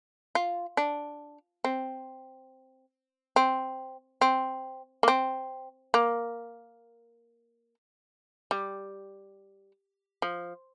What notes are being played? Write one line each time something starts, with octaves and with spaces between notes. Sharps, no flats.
F4
D4
C4
C4
C4
A#3
C4
A#3
G3
F3